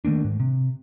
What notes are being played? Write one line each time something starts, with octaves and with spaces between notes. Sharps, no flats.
D#3 A3 A#3 D4
G#2
C3